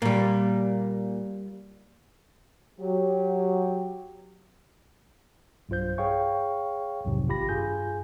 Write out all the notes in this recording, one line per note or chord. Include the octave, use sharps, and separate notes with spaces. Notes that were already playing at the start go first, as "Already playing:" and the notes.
A#2 G3 A#3
F#3 G4
B1 G2 F4 C5 G6
G#4 C#5 F5 G5 C#6
B1 F2 G#2 C3
G#1 F4 G4 B5 A#6
G2 F4 G#4 G#5 G6